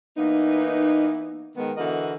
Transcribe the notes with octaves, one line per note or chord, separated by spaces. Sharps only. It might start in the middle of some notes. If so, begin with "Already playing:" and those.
E3 A#3 B3 D#4
D#3 G#3 B3
D3 E3 F#4 A#4 D#5